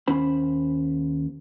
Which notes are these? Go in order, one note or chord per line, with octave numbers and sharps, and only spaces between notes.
D#2 C#4 C5 B5